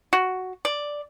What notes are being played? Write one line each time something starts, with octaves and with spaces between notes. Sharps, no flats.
F#4
D5